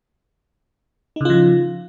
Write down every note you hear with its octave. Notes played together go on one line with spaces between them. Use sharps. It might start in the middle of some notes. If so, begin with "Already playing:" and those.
C#3 F3 D#4 F4